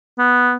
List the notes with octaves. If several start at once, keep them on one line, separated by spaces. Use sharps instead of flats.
B3